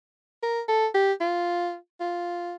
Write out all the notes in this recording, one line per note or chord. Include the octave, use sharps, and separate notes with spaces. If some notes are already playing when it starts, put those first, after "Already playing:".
A#4
A4
G4
F4
F4